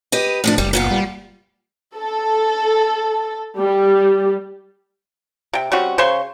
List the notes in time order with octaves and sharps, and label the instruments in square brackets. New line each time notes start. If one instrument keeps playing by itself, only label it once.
[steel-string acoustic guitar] G4 B4 D#5
A2 F3 D4
[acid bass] F#1 [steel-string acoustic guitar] G3
[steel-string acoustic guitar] A#2 B3 F4
[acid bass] G3
[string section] A4
G3
[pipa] C3 G5
G3 C4 C#4 F#4
C#3 C5 C6 C#6